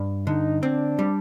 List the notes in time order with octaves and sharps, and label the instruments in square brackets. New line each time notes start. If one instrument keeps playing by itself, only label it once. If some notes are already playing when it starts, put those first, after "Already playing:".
Already playing: [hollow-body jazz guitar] G2
[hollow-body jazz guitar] D3 [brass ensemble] D#4
[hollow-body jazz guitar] C4 [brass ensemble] D4
[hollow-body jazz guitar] G3